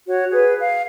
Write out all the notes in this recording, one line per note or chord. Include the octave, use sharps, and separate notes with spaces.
F#4 C#5
G#4 B4
F5